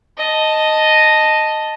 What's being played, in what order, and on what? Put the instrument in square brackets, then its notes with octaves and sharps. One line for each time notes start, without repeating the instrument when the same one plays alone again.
[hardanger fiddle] D#5 A5